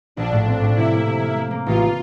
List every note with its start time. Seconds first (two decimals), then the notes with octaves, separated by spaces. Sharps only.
0.16 A#1 D4
0.31 A2
0.46 C4
0.61 A2
0.76 C3 E4
0.91 A#3
1.06 C3
1.21 A#3
1.36 A#3
1.51 A#3
1.66 A1 F4